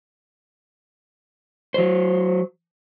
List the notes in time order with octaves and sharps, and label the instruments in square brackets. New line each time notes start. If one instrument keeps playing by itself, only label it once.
[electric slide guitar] F#3 C5